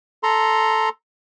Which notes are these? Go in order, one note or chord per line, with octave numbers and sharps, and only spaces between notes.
A4 A#5 C6